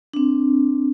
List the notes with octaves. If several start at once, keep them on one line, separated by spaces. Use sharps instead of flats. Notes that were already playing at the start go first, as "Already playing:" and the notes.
C4 D4